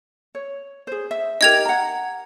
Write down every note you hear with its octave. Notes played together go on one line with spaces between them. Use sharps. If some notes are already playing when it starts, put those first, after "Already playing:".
C#5
G#4 C5
E5
D#4 G4 A#4 D#5 G#6 F7
F#5 A#5